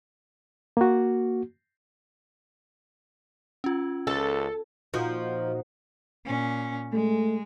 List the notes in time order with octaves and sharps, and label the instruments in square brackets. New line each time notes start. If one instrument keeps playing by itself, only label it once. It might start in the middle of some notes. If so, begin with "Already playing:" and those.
[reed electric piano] A#3 F#4
[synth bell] C#4 F4
[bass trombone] C#2 [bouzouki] A4
[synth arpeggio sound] A#2 D#4 F#4 [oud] F3
[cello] A#2 C#4
[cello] G#3 [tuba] A3